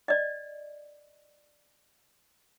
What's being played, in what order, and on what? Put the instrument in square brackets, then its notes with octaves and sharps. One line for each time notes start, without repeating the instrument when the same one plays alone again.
[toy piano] D5 D#5